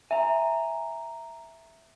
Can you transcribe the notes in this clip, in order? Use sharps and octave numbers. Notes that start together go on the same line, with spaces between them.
E5 G#5 A#5